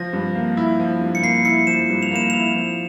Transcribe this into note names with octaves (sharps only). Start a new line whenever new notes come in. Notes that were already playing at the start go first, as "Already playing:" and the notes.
Already playing: F3 A#6
G2
A#3
E4
F3
G2
C#7
A#3 C7
E4 C#7
F3 E7
G2
F7
A#3 E7
E4 F7
F3